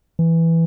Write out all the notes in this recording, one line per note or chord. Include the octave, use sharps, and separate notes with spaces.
E3